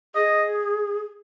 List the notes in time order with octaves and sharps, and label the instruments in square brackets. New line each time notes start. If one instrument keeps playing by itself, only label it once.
[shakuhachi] G#4 [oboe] D#5